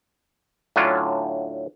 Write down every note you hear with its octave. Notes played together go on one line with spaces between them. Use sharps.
A2 D3 F#3 C#4 D4 F4